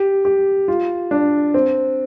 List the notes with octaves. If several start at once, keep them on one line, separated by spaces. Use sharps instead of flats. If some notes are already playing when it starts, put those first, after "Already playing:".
Already playing: G4
G4
F4
D4
C4